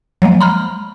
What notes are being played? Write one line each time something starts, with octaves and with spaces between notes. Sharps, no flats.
F3 F#3 G#3 A#3
A#5 B5 F6